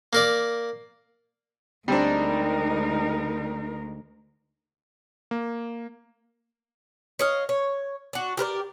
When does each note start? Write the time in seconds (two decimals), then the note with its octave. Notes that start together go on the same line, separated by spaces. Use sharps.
0.13 A#3 A#4 D5
1.88 D2 G3 G#3 C4 D4 D#4 A#4
5.31 A#3
7.19 C#5 D#5 F5
7.49 C#5
8.13 D4 F#4
8.37 G4 A#4 B4 D5